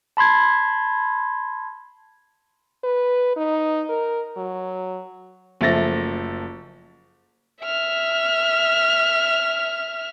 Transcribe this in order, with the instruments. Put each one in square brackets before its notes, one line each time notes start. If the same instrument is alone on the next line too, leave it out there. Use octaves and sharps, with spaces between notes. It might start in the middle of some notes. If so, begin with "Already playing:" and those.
[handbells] A5 B5 C6 G#6
[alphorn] B4
D#4
A#4
F#3
[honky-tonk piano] F#1 F3 A3 E5 A6 A#6
[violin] E5 F6